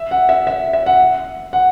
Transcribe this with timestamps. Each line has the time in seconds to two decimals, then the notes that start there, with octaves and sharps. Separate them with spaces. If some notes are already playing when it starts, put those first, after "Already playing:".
Already playing: E5
0.11 F#5
0.29 E5
0.47 E5
0.73 E5
0.86 F#5
1.53 F#5